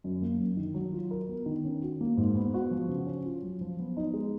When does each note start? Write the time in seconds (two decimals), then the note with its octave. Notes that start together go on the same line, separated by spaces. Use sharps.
0.04 F#2
0.22 A#3
0.40 F#2
0.57 D#3
0.74 F#3
0.93 F4
1.11 A#4
1.29 B3
1.46 D#3
1.65 C#4
1.82 F#4
2.01 A#3
2.17 G#2
2.35 B3
2.54 F#4
2.71 F3
2.89 C#3
3.06 C#4
3.25 F4
3.42 F#3
3.61 F3
3.79 B3
3.97 D#4
4.14 G#3